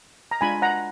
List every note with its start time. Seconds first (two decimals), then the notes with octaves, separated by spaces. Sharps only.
0.31 A#5
0.41 G#3 D4 F4 G#5 B5
0.62 F#5 A#5